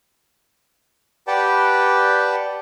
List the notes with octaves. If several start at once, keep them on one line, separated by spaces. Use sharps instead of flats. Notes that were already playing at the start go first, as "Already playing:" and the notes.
G4 B4 D5 F#5 G5 A5